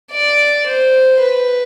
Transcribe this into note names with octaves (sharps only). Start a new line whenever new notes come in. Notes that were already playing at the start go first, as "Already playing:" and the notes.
D5
C5
B4